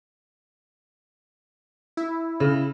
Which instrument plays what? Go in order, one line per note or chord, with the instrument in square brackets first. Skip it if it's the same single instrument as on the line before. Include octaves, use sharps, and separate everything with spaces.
[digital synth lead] E4
[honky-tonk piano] C#3